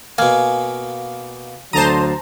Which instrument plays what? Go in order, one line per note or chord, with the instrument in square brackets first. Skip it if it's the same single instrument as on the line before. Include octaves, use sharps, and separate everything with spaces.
[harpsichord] B2 A#3 [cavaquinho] F5 G#5
[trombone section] D2 D3 F#3 [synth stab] C5 A5 A#5 [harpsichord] C6 D#6